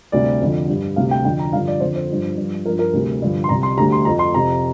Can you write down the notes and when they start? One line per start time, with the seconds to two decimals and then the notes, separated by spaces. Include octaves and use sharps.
0.12 D2 C3 G3 D5
0.41 F2 D3 F3
0.69 G2 G3
0.96 D2 C3 G3 F5
1.11 G5
1.25 F2 D3 F3 G5
1.39 A#5
1.53 G2 D3 F3 F5
1.68 D5
1.80 F2 D3 F3 C5
1.95 C5
2.09 G2 F3
2.37 G2 F3
2.66 G2 F3 A#4
2.79 A#4
2.93 D2 C3 G3
3.22 G2 D3 F3
3.44 C6
3.49 C2 C3 G3 A#5
3.63 C6
3.77 D2 D3 G3 A#5
3.92 C6
4.05 F2 F3 A#5
4.19 C6
4.34 F2 C3 F3 A#5